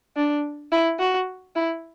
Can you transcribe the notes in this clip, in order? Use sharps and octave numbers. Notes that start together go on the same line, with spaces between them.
D4
E4
F#4
E4